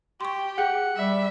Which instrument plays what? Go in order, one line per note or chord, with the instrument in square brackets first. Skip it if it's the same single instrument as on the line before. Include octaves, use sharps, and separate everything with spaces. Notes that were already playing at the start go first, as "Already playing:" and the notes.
[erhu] G4 [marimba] C6 C#6
[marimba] G#4 G5 [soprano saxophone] F#5
[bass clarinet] G3 [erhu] E5